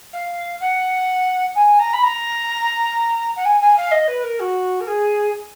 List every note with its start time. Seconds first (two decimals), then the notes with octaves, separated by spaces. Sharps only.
0.13 F5
0.60 F#5
1.55 G#5
1.79 A#5
1.93 B5
2.03 A#5
3.36 F#5
3.45 G#5
3.61 G#5
3.77 F5
3.91 D#5
4.08 B4
4.23 A#4
4.40 F#4
4.80 A#4
4.87 G#4